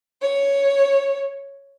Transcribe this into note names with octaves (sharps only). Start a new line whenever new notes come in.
C#5